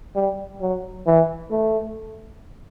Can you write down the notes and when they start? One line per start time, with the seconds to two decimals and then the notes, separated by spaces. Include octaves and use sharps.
0.16 G3
0.61 F#3
1.07 E3
1.51 A3